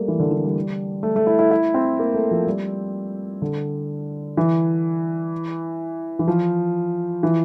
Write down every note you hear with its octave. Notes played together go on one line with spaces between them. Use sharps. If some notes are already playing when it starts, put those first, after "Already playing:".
Already playing: G3 A3 A#3
E3
D3
E3
G3
A3
A3
E4
E4
E4
C4
A#3
A3
F3
G3
D3
E3
E3
F3
E3